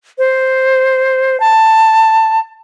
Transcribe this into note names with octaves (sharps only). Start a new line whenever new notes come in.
C5
A5